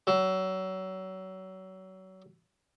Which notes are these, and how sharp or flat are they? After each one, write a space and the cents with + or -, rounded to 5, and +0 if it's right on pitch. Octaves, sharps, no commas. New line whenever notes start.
F#3 +30